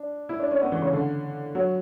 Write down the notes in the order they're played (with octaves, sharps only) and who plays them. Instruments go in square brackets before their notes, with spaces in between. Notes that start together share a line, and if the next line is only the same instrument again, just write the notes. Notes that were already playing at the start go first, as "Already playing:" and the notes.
Already playing: [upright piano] D4
E4
D4
C#4
B3
E3
C#3
D3
F#3